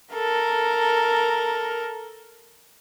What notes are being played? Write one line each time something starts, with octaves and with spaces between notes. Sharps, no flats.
A4 A#4